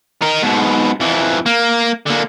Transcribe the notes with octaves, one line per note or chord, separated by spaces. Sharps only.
D#4 A#4
G#2 B2
F2 E3
A#3
D3 A#3